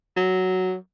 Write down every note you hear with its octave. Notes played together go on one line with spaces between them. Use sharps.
F#3